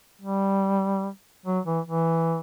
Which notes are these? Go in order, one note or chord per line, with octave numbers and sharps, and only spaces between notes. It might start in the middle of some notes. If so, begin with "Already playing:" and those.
G3
F#3
E3
E3